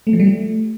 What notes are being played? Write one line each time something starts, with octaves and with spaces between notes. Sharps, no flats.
A3
F3
G3
A3